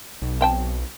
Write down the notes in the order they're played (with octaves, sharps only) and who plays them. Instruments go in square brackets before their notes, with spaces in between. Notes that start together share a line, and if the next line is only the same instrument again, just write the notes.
[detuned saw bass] B1
[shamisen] C4 G5 A5